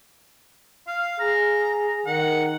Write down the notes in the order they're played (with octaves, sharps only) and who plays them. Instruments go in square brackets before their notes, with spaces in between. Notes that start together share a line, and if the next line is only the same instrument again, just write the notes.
[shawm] F5
[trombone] G#4 [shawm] A#5
[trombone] D#3 [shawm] F#5